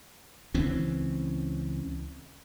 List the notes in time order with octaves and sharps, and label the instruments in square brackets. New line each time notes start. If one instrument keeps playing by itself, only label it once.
[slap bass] C#2 E3 C4 C#4